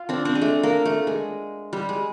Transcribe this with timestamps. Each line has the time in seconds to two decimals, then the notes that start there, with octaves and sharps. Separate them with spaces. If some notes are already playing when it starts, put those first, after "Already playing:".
Already playing: F4
0.09 C4 D4
0.25 C4 D4
0.35 G#3
0.42 A3
0.63 A#3
0.85 A3
1.07 G#3
1.73 G3
1.89 G#3